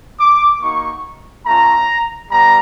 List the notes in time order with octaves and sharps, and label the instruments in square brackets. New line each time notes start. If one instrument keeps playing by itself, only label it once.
[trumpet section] D6
A#3 D#4 F#4 C#6
A3 C#4 F4 A#5
G3 B3 A#5